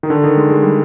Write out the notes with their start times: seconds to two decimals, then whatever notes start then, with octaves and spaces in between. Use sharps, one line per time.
0.03 D#3
0.10 D3
0.24 D#3
0.37 G#3
0.49 G#3
0.64 G3